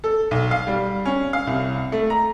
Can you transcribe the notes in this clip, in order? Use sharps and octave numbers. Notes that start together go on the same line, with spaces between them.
A4
B1
F5
G3
C#4
F5
C2
A3
A#5